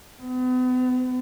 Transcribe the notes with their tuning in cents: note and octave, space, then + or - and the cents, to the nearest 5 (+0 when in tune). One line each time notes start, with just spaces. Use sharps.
B3 +40